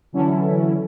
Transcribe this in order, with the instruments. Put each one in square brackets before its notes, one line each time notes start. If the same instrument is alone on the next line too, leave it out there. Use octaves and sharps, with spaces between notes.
[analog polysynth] D3 E3 F#3 C#4 E4 A4